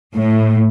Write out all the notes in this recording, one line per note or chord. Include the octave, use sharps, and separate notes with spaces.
A2